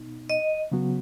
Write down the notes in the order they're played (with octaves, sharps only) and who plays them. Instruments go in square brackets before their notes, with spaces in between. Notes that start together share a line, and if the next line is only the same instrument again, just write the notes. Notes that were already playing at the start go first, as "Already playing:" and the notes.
Already playing: [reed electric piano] B2 B3 D#4
[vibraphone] D#5
[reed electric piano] C#3 F#3 B3 F#4